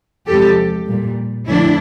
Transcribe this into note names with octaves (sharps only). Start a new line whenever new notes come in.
E2 C3 F3 G#3 G4 A4
A#2 G3
F2 D3 F3 A3 D4 E4